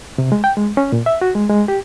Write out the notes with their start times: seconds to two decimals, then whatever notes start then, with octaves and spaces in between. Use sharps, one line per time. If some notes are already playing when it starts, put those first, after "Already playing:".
0.18 C3
0.32 G#3
0.44 G5
0.57 G#3
0.77 C#4
0.92 A#2
1.06 E5
1.21 F#4
1.35 G#3
1.50 G#3
1.68 G4